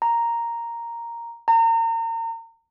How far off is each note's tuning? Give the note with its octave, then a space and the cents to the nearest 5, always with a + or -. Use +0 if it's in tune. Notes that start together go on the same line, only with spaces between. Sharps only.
A#5 +0
A#5 -35